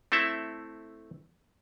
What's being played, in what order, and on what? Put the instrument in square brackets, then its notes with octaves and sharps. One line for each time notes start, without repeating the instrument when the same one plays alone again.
[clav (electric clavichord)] A3 C4 E4 A4 E5